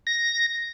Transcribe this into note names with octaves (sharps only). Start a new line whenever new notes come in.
A#6